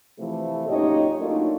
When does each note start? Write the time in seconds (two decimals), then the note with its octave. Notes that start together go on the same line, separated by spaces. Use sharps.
0.19 C3 E3 F3 A3
0.68 F#2 A#2 D#4 G4 C#5 D#5
1.19 F#3 A3 A#3 D4 D#4 F4